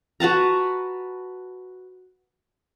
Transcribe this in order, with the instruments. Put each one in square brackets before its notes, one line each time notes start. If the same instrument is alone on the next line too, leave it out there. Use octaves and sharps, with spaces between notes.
[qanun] F#4 B4 A5 A#5